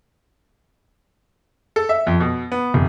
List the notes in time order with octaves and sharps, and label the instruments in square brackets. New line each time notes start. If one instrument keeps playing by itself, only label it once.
[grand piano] A4
E5
F2
B2
B3
F1